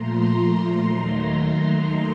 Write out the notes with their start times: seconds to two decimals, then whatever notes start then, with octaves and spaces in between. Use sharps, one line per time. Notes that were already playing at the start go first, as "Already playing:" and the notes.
Already playing: A#2 F3 A3 A#5 C6
0.31 A#5 C6
0.83 D#2 D#3 F#3 A3